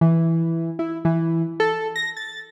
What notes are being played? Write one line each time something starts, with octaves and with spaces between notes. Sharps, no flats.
E3
E4
E3
A4
A#6
A6